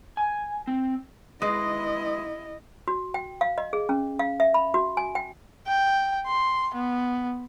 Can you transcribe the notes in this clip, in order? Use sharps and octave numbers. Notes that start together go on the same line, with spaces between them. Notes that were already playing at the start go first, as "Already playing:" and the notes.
G#5
C4
G#3 E4 B4 D#5
F#4
G5
F5
D#5
G#4
C#4
F5
E5
B5
F#4
G#5
G5
G5
C6
B3